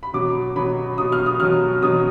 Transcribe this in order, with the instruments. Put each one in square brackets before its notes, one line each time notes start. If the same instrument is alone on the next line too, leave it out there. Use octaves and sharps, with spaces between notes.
[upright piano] B5
B2 F#3 D6
B2 F#3 B5
B2 F#3 D#6
F6
D#6
B2 F#3 F6
B2 F#3 D#6